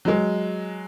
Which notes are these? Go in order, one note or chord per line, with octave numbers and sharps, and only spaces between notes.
F#3 G#3